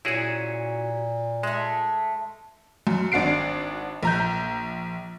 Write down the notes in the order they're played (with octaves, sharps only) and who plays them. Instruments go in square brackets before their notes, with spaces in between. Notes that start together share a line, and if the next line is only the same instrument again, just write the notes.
[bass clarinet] A#2 [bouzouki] F#3 C#4 [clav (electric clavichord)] E4 F#4 G#4
[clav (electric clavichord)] G#3 [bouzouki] A3 E5
[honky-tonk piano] F#2
G#1 D4 F#4 C7 D7
A#1 A#5 G6